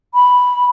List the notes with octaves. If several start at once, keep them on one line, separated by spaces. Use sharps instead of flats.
B5